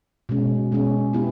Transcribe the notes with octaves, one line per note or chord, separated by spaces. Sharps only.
B2 G#3 C#4
B2 G#3 C#4
B3 E4 G4